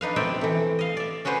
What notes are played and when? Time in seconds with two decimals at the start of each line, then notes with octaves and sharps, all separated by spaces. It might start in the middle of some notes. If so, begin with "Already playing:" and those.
0.01 D4 D#4 B4 F5
0.16 B2 C4 D#4 D5 E5 G5
0.41 E3 A3
0.79 D#5 F5
0.97 D5 E5
1.25 C#4 F#4 G#4 B4 C5